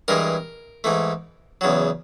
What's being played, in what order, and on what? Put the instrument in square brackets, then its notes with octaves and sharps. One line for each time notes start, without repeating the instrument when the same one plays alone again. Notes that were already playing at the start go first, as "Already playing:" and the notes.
[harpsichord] G2 E3 G#3 A#4
G#2 E3 A3
E2 C#3 F#3